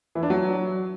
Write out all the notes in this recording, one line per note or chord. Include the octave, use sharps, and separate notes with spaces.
E3
D4
F#3